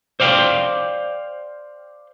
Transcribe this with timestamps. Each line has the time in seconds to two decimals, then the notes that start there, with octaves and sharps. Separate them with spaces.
0.20 C5 D5 F5 G5